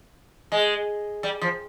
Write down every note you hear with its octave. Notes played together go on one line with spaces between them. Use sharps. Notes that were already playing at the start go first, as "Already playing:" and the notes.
G#3
G3
F3